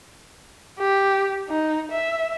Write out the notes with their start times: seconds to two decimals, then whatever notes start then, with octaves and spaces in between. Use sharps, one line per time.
0.79 G4
1.48 D#4
1.91 E5